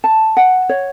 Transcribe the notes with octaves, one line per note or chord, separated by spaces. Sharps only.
A5
F#5
C#5